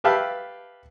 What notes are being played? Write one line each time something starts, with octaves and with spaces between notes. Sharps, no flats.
G4 B4 E5 F5 G5 A5